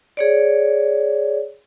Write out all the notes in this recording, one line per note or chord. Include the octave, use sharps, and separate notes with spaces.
G#4 C#5 D5